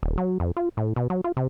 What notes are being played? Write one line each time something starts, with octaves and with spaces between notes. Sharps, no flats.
D#1
F#3
F2
F4
A2
B2
F#3
F4
C3